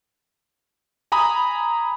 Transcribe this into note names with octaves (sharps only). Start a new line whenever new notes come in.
G#5 A#5 B5 D#6